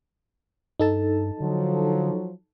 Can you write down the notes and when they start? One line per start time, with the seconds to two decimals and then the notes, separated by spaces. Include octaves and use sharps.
0.79 G2 D#4 A4 A5
1.40 D3 F3 F#3